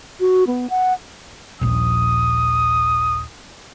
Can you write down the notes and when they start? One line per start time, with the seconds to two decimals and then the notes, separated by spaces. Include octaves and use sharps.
0.20 F#4
0.47 B3
0.70 F#5
1.61 D#1 A#1 D#6